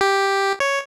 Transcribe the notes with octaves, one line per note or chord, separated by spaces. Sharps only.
G4
C#5